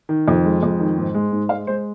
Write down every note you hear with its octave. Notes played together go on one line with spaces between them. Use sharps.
D#3
F2
G#3
F2
D#3
G#2
G#3
G#2
G#3 F5
G#3 C5